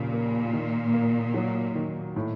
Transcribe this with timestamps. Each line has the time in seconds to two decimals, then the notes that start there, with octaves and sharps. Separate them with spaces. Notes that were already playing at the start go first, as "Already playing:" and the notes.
Already playing: D#2 A#2 C#3 F3
0.13 A#3
0.53 D#3
0.94 A#3
1.34 F#3
1.75 D#3
2.16 A2